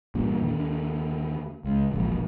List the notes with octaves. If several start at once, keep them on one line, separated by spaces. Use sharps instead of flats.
E2 G2 A#2
D#2 D3
C#2
E1 A#1